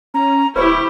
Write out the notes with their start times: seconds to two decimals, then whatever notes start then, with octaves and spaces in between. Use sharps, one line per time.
0.14 C#4 A#5
0.56 D1 E4 G4 B4 C5 C#6